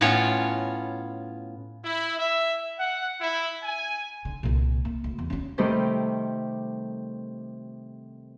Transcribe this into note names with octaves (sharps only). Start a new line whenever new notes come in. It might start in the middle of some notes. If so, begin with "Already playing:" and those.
A2 B3 C#4 F4 C#5
E4
E5
F#5
E4
G#5
D3
C2 A#2
A#3
D2
E2
C#4 D4
C3 D#3 G3 A3 D#4